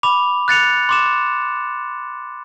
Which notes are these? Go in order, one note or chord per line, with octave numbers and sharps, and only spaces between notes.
B5 D6 F7
F#6 A6 C#7 F7
C6 D6 E7